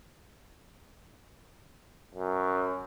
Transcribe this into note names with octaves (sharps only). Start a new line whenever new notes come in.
F#2